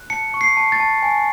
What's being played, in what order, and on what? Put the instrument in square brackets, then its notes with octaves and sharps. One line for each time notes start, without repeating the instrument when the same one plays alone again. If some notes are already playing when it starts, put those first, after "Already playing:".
Already playing: [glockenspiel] F#6
A5 C#7
C#6
C7
A5
A6
A5
G#5